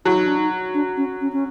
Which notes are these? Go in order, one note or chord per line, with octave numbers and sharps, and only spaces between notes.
F#3 E4
D#4
D4
D#4
D4
C#4
C#4
C#4